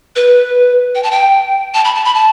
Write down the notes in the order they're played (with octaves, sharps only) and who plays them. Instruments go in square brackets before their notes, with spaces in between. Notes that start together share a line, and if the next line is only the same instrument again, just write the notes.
[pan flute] B4
G5
A5
G5
A5
B5
A5
B5
A5